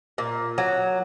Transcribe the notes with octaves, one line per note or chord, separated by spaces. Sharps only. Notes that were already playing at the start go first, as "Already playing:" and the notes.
A#2
F#3